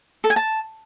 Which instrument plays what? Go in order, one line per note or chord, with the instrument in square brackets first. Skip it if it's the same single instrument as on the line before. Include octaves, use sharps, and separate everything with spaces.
[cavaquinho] A4
G#5
A5